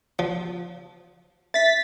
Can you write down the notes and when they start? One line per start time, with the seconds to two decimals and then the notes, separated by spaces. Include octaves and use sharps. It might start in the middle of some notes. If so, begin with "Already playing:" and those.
0.19 F3
1.54 E5 A6 B6